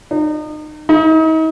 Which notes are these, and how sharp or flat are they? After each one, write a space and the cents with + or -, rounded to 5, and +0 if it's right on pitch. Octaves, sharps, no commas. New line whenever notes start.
D#4 -35
D#4 +40